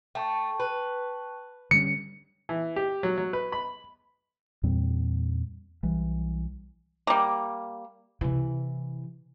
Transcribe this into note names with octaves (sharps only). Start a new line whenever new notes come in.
A3 G5 A5 C#6
B4
D3 G3 C#4 C#7
E3
G4
F#3
F#3
B4
B5
E2 A#2 G3 C4
B1 E3 G3
G3 A#3
C3 E3